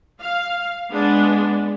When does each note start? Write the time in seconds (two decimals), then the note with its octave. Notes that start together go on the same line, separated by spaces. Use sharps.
0.21 F5
0.92 G#3 B3 D4